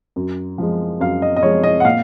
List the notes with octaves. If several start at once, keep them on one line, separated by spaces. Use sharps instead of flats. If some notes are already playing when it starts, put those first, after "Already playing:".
F#2
F3 G#3
F#2 F5
D#5
D#5
F3 G#3 C#5
D#5
F#5
A#2 F5